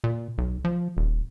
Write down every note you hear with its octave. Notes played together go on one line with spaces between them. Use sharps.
A#2
B1
F3
D#1